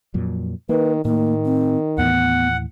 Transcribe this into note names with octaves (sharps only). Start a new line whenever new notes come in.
F2 A#2 F#3
D#3 A#3 B4
A2 D#3 A#3
C4
D#2 A2 E3 B3 F#5